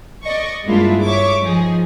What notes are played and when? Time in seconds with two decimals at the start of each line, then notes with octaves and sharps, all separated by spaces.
0.24 D5 D#5 C#6
0.64 G2 G#3 A#3 D4 E4 F4
1.04 C#5 E5 C#6 D6
1.40 F3 D#4 G#4